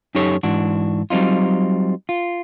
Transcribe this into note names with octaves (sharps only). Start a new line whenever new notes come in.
F#2 D#4 G4 A4 C#5
G#2 E3 D4 F#4
F#3 G3 C4 D#4 F4
F4